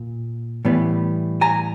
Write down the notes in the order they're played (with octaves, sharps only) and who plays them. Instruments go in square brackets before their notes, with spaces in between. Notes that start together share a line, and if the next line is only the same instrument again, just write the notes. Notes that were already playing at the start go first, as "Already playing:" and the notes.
Already playing: [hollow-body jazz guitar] A#2
A2 E3 G3 B3
G#5 A#5